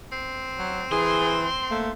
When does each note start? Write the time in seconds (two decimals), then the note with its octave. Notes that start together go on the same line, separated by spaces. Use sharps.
0.12 C4
0.58 F#3
0.92 E3 G#4 C6
1.70 A3 A#3